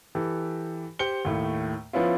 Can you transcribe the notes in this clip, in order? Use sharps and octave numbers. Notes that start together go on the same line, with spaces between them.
E3 G4 A4
G4 C5 C#7 G7
D#2 A2 A3
F3 B3 C#4 E4 F4